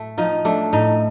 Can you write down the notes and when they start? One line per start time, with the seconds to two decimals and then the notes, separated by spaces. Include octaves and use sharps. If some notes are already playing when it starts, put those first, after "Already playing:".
Already playing: A2 A3
0.18 F3 D#4
0.45 A3 D4
0.73 A2 D#4